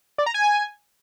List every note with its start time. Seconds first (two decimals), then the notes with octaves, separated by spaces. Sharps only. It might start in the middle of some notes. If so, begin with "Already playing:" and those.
0.18 D5
0.26 A#5
0.34 G#5